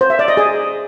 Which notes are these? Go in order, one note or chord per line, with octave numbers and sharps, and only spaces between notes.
C5
E5
D5
D#5
G#4